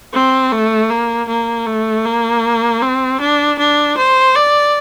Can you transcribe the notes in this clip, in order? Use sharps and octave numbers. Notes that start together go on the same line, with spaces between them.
C4
A3
A#3
A#3
A3
A#3
C4
D4
D4
C5
D5